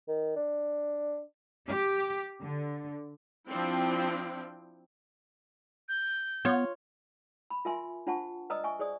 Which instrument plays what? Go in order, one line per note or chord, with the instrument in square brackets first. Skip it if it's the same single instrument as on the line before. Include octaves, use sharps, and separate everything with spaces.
[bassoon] D#3
D4
[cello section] G4
D3
[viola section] F3 C4 D4 E4 G5
[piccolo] G6
[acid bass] B3 [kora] F4 C#5
[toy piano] B5
F4 A#4 E5 G#5 C6
D4 F4 C5 F#5 A5 C#6
B4 D5 D#5 A#5 D#6 E6
E5 G#5 C#6
G#4 C5 D5 D#6